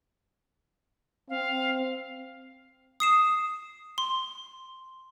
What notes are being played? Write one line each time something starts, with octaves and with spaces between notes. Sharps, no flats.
C4 F5
D#6 C7 E7
C6